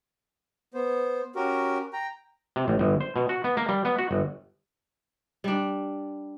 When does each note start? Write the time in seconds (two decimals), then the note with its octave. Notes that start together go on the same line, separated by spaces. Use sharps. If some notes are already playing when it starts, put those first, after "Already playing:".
0.74 B3 C5
1.35 C#4 F#4 G4 A#4
1.93 G5 A#5
2.56 C3
2.68 A1
2.79 G1
3.01 C5
3.16 B2
3.29 F#4
3.44 B3
3.57 A#3
3.69 G3
3.85 B3
3.98 F#4
4.11 G1
5.44 G3 D4